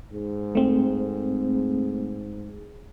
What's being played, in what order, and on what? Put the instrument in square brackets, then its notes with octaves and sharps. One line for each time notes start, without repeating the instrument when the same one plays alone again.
[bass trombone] G#2
[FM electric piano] A3 C4